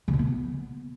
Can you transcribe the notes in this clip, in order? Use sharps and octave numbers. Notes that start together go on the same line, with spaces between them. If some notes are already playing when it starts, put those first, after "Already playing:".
C#3
B2
B3